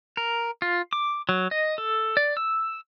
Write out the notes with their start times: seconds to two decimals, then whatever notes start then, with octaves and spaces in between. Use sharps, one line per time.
0.17 A#4
0.62 F4
0.93 D6
1.29 F#3
1.51 D#5
1.78 A4
2.17 D5
2.37 E6